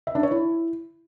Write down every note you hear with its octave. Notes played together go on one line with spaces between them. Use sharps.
E5
D4
C#5
E4